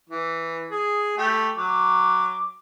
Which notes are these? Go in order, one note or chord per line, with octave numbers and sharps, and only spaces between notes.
E3
G#4
A3 G4
F#3 D6